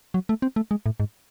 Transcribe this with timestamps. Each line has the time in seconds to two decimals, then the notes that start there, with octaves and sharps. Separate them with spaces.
0.14 F#3
0.29 A3
0.42 C4
0.56 A3
0.71 G#3
0.86 A2
1.00 G#2